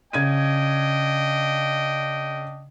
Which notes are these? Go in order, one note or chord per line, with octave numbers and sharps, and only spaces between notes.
C#3 D4 D#5 G5 G#6 D#7